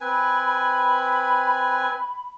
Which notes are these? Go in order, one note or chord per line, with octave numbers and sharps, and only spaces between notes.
C4 B4 G#5 B5